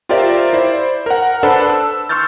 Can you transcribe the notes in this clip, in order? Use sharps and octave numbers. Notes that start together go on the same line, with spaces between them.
F4 G4 A#4 C5 D5 E5
E4 C5 D5
A#4 F#5
D4 A4 B4 C5 A5 B5
E6
C6 C#6 E6 F6 G6 A6